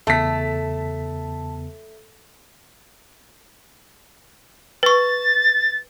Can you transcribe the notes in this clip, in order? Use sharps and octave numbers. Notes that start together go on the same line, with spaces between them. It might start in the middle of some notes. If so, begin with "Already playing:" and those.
E2 C#3 A3 B3 A5 B6
B4 C#6 A6